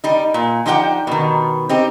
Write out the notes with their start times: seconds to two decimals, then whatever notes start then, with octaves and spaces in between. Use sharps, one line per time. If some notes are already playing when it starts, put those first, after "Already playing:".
0.04 G3 D#4
0.34 A#2
0.66 F3 D4 D#4 G4 F#5 G5
1.07 B2 D#3
1.69 C4 D#4 G4